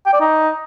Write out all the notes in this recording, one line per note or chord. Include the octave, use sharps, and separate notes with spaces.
G5
D5
D#4